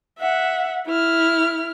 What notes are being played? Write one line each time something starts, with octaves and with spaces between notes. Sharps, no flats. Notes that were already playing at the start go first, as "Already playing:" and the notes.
E5 F#5
E4 F6